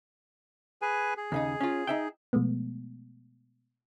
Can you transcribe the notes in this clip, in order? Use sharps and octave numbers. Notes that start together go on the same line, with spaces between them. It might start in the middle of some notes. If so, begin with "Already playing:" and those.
G#4 B4 G#5
G#4
D#2 C#3 D#4
C#4 F4
D#4 E5 G5
B2 F3 G#3 A3 B3